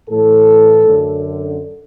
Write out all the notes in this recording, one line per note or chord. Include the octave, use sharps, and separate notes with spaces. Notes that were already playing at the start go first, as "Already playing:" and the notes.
A2 E3 A4
F#2 D3